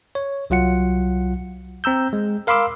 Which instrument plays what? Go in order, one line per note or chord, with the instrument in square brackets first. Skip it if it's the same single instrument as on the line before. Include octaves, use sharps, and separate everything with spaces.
[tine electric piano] C#5
C2 F#3 F4 F#5 C#7
C4 A#5 E6 G6
G#3
A#4 F5 B5 C6 D6 E6